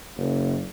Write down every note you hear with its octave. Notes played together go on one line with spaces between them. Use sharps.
F#1